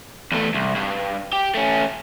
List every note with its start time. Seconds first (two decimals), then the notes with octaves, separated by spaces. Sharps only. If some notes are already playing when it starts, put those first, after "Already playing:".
0.32 E2 A3
0.54 C2
0.76 G2
1.33 G4
1.55 A3 C#4